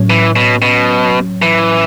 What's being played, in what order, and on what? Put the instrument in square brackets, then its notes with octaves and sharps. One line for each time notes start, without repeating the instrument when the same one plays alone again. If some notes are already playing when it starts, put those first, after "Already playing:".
Already playing: [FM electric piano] A2 F#3 C#4 C#5
[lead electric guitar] E3
B2
B2
E3